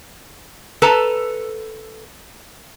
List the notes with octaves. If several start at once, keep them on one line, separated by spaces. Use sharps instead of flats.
A4 B4 A5 A#5